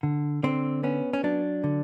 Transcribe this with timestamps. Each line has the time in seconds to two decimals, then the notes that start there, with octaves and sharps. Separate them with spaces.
0.03 D3
0.43 D3 C4
0.83 B3 C#4
1.13 C#4
1.23 F#3 D4
1.64 D3